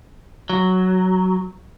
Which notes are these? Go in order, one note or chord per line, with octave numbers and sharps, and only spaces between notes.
F#3